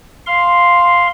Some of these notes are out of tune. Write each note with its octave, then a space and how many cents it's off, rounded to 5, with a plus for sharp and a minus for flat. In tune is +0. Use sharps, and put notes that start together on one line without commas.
F5 +0 C6 +0